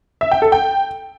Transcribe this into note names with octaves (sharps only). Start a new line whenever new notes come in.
E5
G5
A4
G5